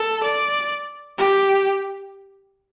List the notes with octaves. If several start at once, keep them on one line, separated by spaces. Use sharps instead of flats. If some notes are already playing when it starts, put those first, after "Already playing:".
Already playing: A4
D5
G4